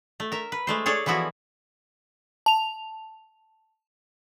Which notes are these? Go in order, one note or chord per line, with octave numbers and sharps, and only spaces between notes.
A3
A#4 E5
B4
G#3 A3 C5
G#4 A4 C#5 D5
E3 F3 B3 E4 F#4
A5 F7